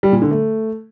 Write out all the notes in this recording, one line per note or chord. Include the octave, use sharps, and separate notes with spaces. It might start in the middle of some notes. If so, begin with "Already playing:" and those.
G3
A#2
D3
A3